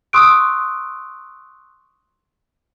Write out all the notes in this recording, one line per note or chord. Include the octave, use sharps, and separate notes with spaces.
C6 C#6 D#6 E6 F#6 D7